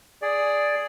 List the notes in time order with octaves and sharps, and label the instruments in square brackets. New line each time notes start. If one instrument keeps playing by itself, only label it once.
[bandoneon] G#4 D5